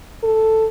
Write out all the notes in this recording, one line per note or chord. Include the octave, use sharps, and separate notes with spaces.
A4